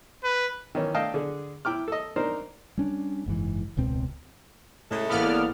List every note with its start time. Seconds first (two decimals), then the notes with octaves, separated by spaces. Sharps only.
0.24 B4
0.75 D#3 E3 C#4
0.94 A3 D4 D#5 F5 G5 A5
1.14 D3 D4 G#4
1.65 E4 G5 D6 F6
1.88 A4 D#5
2.16 C4 D4 D#4 A#4 C5
2.78 G3 C#4 D4
3.26 F#1 G#2 B2 E3
3.77 E1 C#2 B2 C4
4.91 A2 C#3 G#3 A4 E5
5.10 A1 A#3 B3 E4 D5 B5 F6